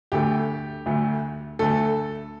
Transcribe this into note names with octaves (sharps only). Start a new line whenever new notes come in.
D2 D3 A3 G4
D2 D3 A3
D2 D3 A3 A4